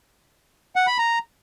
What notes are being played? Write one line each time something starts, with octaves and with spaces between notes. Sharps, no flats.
F#5
B5
A#5